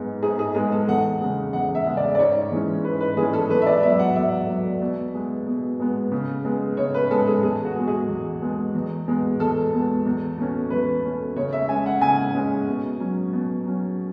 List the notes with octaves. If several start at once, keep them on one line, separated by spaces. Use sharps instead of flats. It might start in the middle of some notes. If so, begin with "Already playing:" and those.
Already playing: G#2 G#3 B3
G#2 G#4
G#4
G#3 B3 G#4
A4
E2 F#5
C#3 G#3
E2 F#5
E5
C#3 G#3
D5
D5
G#2 C#5
E3 G#3 C#4
G#2 B4
B4
E3 G#3 C#4 G#4
A4
E2 B4
E5
D5
B2 F#3 E5
F#5
E2 E5
B2 F#3
B2
G#3 B3
B2
G#3 B3
C#3
G#3 B3
C#3 C#5
B4
G#3 B3 A4
G#4
E2 G#4
F#4
B2 G#3
G#4
E2
B2 G#3
E2
B2 G#3 B3
E2 A4
B2 G#3 B3
E2
B2 A3 C#4
E2 B4
B2 A3 C#4
C#3 C#5
E5
G#3 C#4 G#5
F#5
C#3 G#5
G#3 C#4
B2
F#3 C#4
B2
F#3 C#4